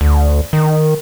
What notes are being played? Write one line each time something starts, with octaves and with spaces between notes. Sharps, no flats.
D2
D#3